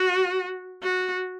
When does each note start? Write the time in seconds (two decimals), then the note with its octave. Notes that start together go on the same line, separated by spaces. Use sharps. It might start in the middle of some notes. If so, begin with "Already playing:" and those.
Already playing: F#4
0.83 F#4